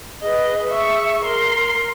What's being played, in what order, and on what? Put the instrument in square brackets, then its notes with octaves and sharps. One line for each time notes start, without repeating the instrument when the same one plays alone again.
[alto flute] G#4 [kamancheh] B4 D#5
[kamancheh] E5 C#6
A#4 C6